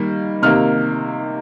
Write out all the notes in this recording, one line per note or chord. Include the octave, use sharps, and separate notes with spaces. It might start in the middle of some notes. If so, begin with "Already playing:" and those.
Already playing: D#3 G3 A#3
C3 D#3 A#3 F6